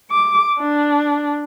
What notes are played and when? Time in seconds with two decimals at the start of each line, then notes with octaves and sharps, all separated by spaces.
0.11 D6
0.59 D4